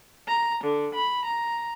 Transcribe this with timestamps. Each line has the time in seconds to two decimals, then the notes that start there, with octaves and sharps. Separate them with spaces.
0.28 A#5
0.64 D3
0.94 B5
1.25 A#5